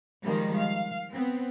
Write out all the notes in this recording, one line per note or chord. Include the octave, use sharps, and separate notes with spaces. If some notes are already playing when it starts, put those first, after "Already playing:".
D#3 F3 G3 G#3 A#3
F5
B3 C4